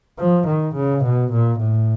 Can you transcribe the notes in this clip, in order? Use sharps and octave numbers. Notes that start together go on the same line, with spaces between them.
F3
D#3
C#3
B2
A#2
A2